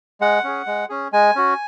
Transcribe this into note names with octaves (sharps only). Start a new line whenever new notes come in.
G#3 F#5
C#4 G#4
G#3
C#4 G#4
G#3 G#5
C#4 F#4